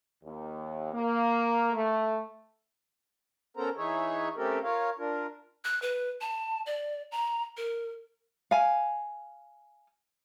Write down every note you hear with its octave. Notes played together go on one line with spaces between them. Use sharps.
D#2
A#3
A3
B3 C#4 A4 A#4 C5 A#5
E3 D#4 G#4 C#5 E5
A3 C4 C#4 G4 A4 A#4
F4 A#4 C#5 F5
D4 F4 A#4
F#6
B4
A5
D5
A#5
A#4
F5 G#5